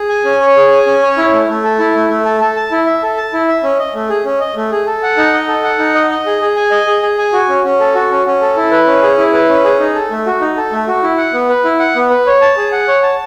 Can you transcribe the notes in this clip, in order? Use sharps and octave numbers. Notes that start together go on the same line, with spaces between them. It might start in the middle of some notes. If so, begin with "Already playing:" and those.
Already playing: G#4
G#5
C#4
C#5
G#4
G#5
C#4
C#5
E4
A3
A3
A4
E4
A3
A3
A4
A4
A5
E4
E5
A4
A5
E4
E5
C#4
D#5
A3
G#4
C#4
D#5
A3
G#4
A4
F#5
D#4
D#5
A4
F#5
D#4
D#5
D#5
G#4
G#4
G#5
D#5
G#4
G#4
G#5
F#4
C#4
C#4
A4
F#4
C#4
C#4
A4
E4
B4
C#4
G#4
E4
B4
C#4
G#4
D#4
A4
A3
F#4
D#4
A4
A3
F#4
E4
F#5
B3
B4
E4
F#5
B3
B4
C#5
A5
G#4
F#5
C#5
A5